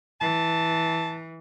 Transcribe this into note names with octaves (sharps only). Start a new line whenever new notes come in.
E3 A5